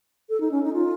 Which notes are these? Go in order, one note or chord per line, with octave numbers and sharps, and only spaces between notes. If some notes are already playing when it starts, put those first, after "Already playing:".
A4
D#4
C#4
D#4
F4